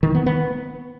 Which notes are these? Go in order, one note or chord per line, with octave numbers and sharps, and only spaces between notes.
D#3
B3
B3